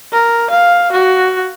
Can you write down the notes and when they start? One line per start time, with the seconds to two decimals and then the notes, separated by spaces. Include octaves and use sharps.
0.12 A#4
0.50 F5
0.92 F#4